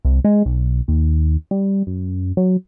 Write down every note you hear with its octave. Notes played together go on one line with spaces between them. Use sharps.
C2
G#3
B1
D#2
G3
F#2
F#3